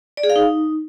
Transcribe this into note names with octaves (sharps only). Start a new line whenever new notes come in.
D5
G#4
F5
D#4